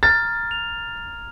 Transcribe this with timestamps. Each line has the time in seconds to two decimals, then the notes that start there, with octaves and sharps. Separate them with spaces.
0.03 A#5 F6 G#6 A6
0.51 F7